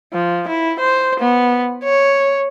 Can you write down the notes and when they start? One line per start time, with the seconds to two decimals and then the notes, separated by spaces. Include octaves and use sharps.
0.13 F3
0.48 E4
0.79 C5
1.20 B3
1.84 C#5